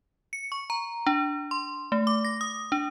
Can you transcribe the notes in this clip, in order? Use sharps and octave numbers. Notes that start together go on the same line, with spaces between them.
C#7
C#6
A#5
D4
C6
A3
D6
A#6
D#6
D4